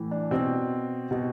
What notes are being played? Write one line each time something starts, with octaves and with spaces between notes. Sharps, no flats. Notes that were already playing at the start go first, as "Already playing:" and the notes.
Already playing: A2 E3
D4
B2 C4
B2